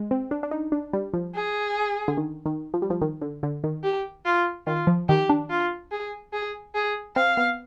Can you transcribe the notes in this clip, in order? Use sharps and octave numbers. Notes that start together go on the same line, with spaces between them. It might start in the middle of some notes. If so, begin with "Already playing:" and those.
Already playing: G#3
C4
D4
D4
D#4
D4
G3
F3
G#4
D3
D#3
D#3
F3
G3
F3
D#3
D3
D3
D#3
G4
F4
D#3 F4
F3
D#3 G4
D4
F4
G#4
G#4
G#4
C4 F5
B3